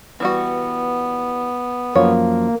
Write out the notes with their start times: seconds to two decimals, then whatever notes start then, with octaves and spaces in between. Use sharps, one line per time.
0.20 E3 G3 B3 F#4
1.95 F#2 F3 A#3 F4 C#5